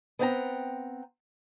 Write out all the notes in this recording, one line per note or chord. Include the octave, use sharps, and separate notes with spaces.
B3 C4 F#5 G5 A5 A#5